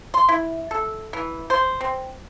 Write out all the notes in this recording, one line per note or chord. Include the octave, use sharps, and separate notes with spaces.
C6
E4
A4
E3
C5
C4